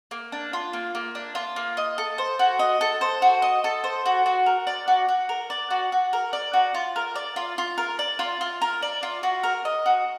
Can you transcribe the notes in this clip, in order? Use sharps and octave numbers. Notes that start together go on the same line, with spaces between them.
A#3
D4
F4
A#3
A#3
D4
F4
A#3
D#5
A4
C5
F#4
D#5
A4
C5
F#4
D#5
A4
C5
F#4
F#4
A#4
D5
F#4
F#4
A#4
D5
F#4
F#4
A#4
D5
F#4
F4
A#4
D5
F4
F4
A#4
D5
F4
F4
A#4
D5
F4
F#4
A#4
D#5
F#4